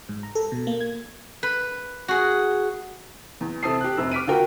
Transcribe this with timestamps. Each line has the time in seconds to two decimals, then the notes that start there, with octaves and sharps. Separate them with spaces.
0.09 G#2
0.23 A#5
0.35 A4
0.52 B2
0.67 A#3
0.81 G#6
1.43 B4
2.08 F#4 G#4
3.41 E2
3.63 C3 A4 C5 A5 D#6 C7
3.81 G4 F#6
3.97 F1 C3 C5 E6
4.11 D6 F6 B6 D7 D#7
4.27 D3 F4 F#4 A#4 G5